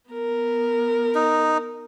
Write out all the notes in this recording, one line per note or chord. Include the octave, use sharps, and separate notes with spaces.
B3 A#4
D#4